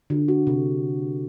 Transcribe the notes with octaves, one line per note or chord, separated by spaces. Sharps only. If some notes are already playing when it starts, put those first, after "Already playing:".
D3
F#4
C3